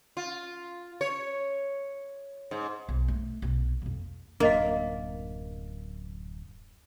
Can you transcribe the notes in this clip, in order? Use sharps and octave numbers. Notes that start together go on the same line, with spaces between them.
F4
C#5
G#2
B1
A3
B1
F2 A#3
D1 F#2 A#3 D4 A#4 D#5 F5